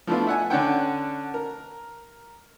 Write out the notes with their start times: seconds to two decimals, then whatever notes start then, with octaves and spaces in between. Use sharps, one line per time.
0.07 F3 A3 B3 D4 E4 F4
0.27 E5 F#5 G#5
0.50 D3 C#4 D4 C#5 F#5 G5
1.34 A#4